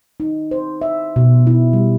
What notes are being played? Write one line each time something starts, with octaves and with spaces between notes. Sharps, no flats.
D#4
C5
E5
B2
E4
G3